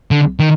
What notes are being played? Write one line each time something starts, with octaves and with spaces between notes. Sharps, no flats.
D3
D#3